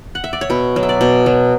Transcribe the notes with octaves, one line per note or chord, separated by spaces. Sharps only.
F#5
E5
D5
C#5
B2 B4
F#3
E5
D5
B2
F#3